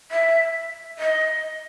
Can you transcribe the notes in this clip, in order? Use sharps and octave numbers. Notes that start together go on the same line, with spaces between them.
E5
D#5